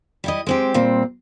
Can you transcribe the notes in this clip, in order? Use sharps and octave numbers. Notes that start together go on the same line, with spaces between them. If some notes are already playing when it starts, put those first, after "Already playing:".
G3 E4 D#5
G#3 C4 G4
A#2 G3 C4